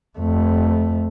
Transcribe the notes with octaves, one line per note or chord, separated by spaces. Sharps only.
F2 A3